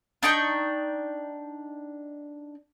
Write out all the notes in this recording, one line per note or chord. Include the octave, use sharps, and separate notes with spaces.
D4 D#4 G5 C#6